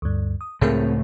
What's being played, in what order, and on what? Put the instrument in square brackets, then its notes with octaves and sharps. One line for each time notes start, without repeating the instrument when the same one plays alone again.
[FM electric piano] D2 G2
D#6
[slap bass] C#2 A2 A3 [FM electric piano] C4 G#4 A#4